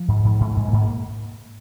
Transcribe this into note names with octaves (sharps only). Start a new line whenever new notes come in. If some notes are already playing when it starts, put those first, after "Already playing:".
Already playing: F3
G#2
G#2
G#2
G#2 G#3
A#3
G#2
A#3